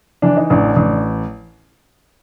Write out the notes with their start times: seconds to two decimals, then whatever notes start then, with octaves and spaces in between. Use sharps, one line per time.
0.22 E3 D4
0.37 D#4
0.50 A1 D4
0.76 A1